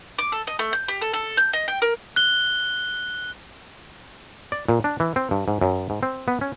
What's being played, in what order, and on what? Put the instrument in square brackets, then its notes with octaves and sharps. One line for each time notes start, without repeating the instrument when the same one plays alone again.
[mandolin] D6
A4
D#5
A3
G6
G4
A4
A4
G6
D#5
G5
A#4
[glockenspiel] F#6 G7
[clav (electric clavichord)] D5
A#2
D4
E3
C4
G2
G#2
F#2
G#2
C4
B3
C#4